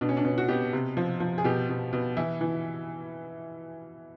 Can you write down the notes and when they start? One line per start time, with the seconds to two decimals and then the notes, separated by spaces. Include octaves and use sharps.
0.01 B2 D4
0.09 C#4
0.17 D4
0.25 B2 C#4
0.38 F#4
0.48 B2 G4
0.73 C3
0.97 F3
1.20 F3
1.38 G#4
1.44 B2 G4
1.69 B2
1.93 B2
2.17 E3 E4
2.41 E3